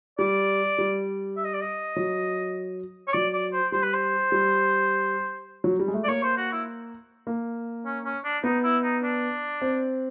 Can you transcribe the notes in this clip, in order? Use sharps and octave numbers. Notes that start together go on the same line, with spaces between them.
G3 D5
G3
E5
D#5
D5
D#5
F#3
C#5
F#3 D5
D5
C5
G3 C5
B4
C5
G3
F#3
G3
G#3
A3
D5
A#3 C#5
C5
F#4
E4
A#3
C#4
C#4
D4
B3 D#4
E4
D#4
D4
C4